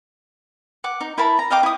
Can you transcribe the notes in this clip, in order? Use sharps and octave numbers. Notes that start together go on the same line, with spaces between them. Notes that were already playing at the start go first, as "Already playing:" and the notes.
F#5 D6
D#4
E4 A#4 A5 B5
A#5
D#5 F5 G5 D6
E4 D#6